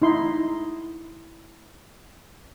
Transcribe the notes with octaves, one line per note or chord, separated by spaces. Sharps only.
D#4 E4 C6